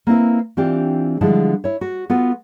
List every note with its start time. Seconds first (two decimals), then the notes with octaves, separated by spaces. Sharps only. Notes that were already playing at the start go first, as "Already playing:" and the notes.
0.07 A#3 C4 E4 B4
0.57 E3 C4 D4 F4 G4
1.21 D3 F3 G3 G#3 E4 A5
1.64 E4 C#5
1.81 F#4
2.10 B3 F4 F#4 A4 B4